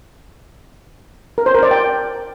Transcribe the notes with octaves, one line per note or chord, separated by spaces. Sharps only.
A#4
C5
A#4
D5
G5